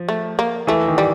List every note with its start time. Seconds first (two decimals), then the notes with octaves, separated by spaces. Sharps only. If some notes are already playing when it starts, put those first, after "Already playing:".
Already playing: F3
0.09 A3
0.39 A#3
0.67 E3 A3
0.88 D#3
0.98 G3